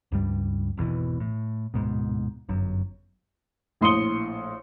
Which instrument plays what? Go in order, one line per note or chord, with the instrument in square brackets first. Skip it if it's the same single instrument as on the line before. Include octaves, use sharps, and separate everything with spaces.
[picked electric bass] C#2 G2 G3
G#1 E2 B2 E3
A2
D1 G#2 B2
G1 F#2
[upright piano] A#1 A2 C6 D#6 C#7 G7